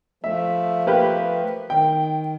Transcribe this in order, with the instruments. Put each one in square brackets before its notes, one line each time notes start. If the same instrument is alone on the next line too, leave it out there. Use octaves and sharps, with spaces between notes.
[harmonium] F3 A3 [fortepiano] E5
[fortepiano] A#3 G4 B4
[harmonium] D#3 [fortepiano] G5